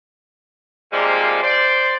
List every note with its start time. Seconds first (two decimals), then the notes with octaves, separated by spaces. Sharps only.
0.93 C3 F3 G3 G#3 A#3
1.42 C5 D5